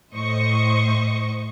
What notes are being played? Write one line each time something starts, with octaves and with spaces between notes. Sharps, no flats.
A2 C5 D#5 C#6